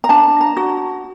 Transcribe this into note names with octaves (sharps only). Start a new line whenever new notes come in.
A#5
D4 A5
A#5
F#4